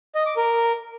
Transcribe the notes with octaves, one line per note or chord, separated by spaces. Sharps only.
D#5
D6
A#4